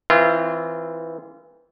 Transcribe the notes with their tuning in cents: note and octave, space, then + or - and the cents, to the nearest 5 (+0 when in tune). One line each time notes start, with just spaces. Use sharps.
E3 -15 C4 +0 F4 -30